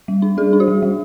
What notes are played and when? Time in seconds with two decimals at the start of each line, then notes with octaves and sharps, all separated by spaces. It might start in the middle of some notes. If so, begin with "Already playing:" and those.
0.08 G3
0.22 D4
0.37 G3 G#4
0.53 D4
0.60 F#4
0.68 G3
0.82 G3